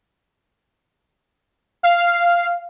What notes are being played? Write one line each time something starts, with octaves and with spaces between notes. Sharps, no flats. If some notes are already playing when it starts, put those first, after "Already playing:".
F5